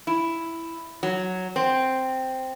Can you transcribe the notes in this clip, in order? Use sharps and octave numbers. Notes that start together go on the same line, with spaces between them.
E4
F#3
C4